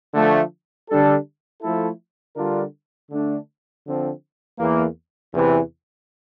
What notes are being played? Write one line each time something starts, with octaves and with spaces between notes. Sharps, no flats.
D3 F3 A3
D3 G3 D4 A4
F3 A3 E4 A4
D3 G3 D4 F4 A#4
D3 A3 D4
D3 F3 C4
E2 E3 A#3
E2 C3 E3